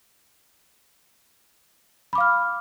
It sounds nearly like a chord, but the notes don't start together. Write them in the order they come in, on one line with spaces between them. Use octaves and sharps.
B5 D6 F5 F6